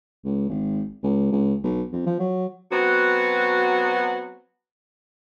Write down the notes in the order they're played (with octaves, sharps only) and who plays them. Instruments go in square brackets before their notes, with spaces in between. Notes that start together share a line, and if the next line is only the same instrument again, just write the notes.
[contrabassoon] C#2
G#1
C#2
C#2
B1
F2
F3
F#3
[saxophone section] F#3 B3 C4 F#4